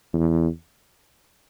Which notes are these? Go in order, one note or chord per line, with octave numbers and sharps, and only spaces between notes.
E2